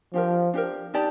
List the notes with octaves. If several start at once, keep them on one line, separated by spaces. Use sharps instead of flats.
F3 D4 G4 A#4
D4 G4 A#4
D#4 G4 D5 A5